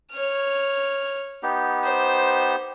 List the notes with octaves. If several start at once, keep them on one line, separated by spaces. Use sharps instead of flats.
C#5 F6
B3 D#4 G4
C5